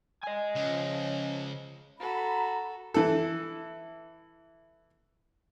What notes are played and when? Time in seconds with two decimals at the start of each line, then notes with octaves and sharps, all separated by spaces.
0.23 D#5 G#5
0.55 C#2 F3 C#4
1.99 F#4 A4 A#5 B5
2.94 E3 A4